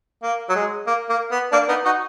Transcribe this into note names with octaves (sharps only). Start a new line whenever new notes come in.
A#3
F#3
G#3
A#3
A#3
B3
A#3 D4
B3 D#4
D#4 F#4